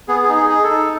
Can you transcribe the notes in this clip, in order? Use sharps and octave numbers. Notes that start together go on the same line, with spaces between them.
B3 G#4
G#4
D#4
G#4
G#4
A4
D#4